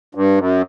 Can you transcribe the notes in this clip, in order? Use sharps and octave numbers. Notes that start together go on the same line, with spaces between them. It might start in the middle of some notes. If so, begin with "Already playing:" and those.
G2
F#2